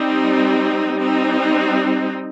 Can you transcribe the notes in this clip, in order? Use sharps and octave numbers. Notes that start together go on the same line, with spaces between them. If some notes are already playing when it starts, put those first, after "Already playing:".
Already playing: G3 C4 D#4
G3 C4 D#4